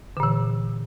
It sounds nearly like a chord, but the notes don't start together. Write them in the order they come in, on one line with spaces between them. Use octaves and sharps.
D3 A#2 E3